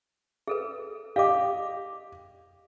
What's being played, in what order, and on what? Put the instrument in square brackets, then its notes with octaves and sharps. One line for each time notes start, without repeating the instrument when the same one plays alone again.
[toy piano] G#4 A4 B4
[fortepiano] G4 D#5 [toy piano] F5 D6